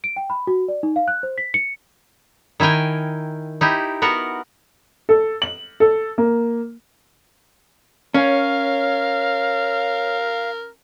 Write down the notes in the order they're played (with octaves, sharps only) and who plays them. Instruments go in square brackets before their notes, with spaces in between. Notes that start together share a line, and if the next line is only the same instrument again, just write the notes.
[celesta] D7
G5
B5
F#4
D5
D#4
F5
F#6
C5
B6
C#7
[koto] D#3 E4 A#4 G5 G#5
D#4 E4 G4
B3 F#4 A#4
[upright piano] A4
F#7
A4
A#3
[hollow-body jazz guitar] C#4 [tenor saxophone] A#4 [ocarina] C#5 [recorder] F5